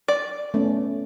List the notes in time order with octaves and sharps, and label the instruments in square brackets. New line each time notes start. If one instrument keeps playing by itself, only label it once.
[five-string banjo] D5
[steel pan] A3 B3 C#4